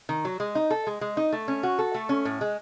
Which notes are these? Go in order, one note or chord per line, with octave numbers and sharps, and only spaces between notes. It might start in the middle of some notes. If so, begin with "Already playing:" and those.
D#3
F#3
G#3
D#4
A4
G#3
G#3
D#4
A3
C#4
F#4
A4
A3
C#4
A2
G#3